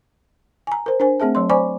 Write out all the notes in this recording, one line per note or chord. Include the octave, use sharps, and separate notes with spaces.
G#5 A#5
A#4 C5
D4 A#4 C5 G#5
A3 C4 G#4 E5 A5
F#3 C#5 C6
C5 D5 G#5 B5 C#6 D6